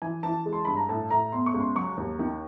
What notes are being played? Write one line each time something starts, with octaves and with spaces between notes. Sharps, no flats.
E3 G#5
E3 A5
G#3
C6
G2 B5
A#5
A2 A5
A2 A#5
B2 C6
C#6
C#2
C6
F#3 C#6
D#2
D#3